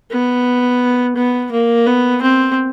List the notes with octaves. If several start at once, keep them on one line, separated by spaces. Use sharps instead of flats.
B3
B3
A#3
B3
C4